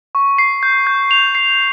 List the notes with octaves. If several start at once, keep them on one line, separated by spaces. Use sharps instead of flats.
C#6
C7
G6
G6
F7
C7